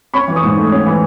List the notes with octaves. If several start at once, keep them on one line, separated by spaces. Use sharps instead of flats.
C#4 B5 C#6
E3
C#6 D#6
G#2
A3
C#4
E3